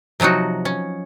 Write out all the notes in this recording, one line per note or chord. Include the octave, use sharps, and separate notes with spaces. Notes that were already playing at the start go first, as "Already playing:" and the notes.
C3 F3 F#3 D#4 F#4
C#4